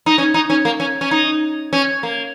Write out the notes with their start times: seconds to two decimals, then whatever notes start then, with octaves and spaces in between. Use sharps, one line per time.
0.06 D#4
0.18 C#4
0.34 D#4
0.50 C#4
0.65 A#3
0.80 C#4
1.01 C#4
1.11 D#4
1.73 C#4
2.03 A#3